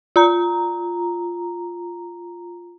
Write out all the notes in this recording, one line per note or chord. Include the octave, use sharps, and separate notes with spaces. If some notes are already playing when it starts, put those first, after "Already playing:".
F4 A#5